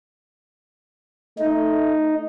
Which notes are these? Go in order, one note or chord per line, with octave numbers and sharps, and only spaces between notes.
A3 D#4